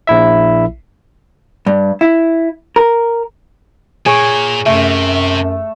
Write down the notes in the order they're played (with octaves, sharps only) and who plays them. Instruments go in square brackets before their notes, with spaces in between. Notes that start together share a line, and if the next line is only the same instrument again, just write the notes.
[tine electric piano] A#1 E4 E5
[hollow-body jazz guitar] G2
E4
A#4
[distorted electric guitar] A#2 [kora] G#4 C#5
[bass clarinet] F#2 [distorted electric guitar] C3 [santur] A3